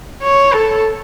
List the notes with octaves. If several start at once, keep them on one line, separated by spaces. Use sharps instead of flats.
C#5
A4